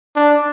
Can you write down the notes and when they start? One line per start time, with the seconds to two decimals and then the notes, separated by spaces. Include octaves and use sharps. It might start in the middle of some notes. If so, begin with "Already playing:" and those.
0.16 D4